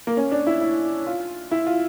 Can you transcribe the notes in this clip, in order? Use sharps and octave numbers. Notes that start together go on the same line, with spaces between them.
A#3
C#4
D4
E4
E4
F4
E4
F4